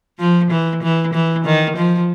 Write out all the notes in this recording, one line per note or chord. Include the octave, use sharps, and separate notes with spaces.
F3
E3
E3
E3
D#3
F3